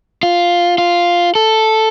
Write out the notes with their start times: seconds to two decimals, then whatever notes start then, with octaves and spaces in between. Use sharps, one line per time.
0.23 F4
0.78 F4
1.35 A4